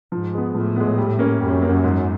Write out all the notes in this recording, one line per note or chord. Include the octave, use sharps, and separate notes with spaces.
G#2 F3
G#3 B3
A2 F3
G#3 B3
G3
A#3 C#4
F#2 G3
A#3 C#4
G#2